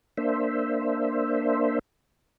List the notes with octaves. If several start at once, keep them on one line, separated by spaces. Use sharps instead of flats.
A#3 D4 C5 E5